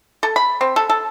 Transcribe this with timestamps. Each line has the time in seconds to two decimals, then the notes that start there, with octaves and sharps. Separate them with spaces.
0.23 A4
0.36 B5
0.61 C4
0.76 A4
0.90 A4